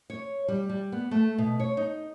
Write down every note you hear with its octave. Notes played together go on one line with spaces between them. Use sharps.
C#5
G3
G3
B3
A3
B2
C#5
D#4